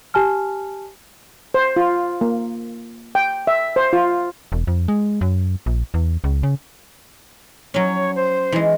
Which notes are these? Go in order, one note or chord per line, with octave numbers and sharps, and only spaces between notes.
G4 G#5 A5 F6
C5
F4
A#3
G5
E5
C5
F4
E1
F2
G#3
F#2
A#1
E2
C#2
C#3
F#3 C#4 C#5
C5
E3 G#3